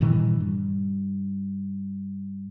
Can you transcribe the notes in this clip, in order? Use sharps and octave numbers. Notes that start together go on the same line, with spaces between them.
G2 A#2 D#3 E3
G2